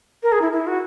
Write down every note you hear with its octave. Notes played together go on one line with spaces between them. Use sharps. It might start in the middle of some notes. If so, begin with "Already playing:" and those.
A#4
G#4
E4
E4
F#4